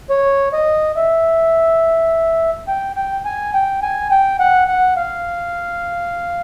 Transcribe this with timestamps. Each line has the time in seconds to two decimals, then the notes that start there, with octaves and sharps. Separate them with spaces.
0.10 C#5
0.53 D#5
0.96 E5
2.68 G5
2.96 G5
3.25 G#5
3.54 G5
3.82 G#5
4.11 G5
4.40 F#5
4.68 F#5
4.96 F5